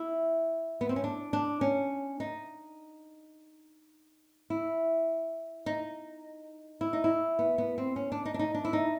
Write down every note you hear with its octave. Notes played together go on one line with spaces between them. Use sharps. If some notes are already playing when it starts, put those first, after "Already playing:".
Already playing: E4
B3
C4
C#4
D4
D4
C#4
D#4
E4
D#4
E4
D#4
E4
B3
B3
C4
C#4
D4
D#4
D4
D#4
D4
E4
D#4